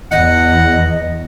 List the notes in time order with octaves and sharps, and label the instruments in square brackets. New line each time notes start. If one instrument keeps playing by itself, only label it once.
[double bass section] E2 [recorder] D#5 [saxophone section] F#5